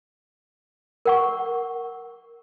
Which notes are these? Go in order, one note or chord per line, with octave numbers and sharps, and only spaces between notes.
A#4 F#5 C#6